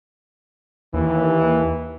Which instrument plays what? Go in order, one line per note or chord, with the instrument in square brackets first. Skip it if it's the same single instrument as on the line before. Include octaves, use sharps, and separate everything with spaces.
[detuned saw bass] D#2 [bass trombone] E3